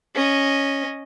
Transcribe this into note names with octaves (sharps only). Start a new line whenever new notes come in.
C#4 D#5